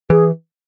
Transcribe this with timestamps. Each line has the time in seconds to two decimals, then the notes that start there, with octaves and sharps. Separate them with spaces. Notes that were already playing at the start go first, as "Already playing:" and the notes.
0.10 E3 G#4